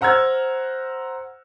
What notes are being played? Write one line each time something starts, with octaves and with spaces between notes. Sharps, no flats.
C5 F#5 A#5 E6 F6 G#6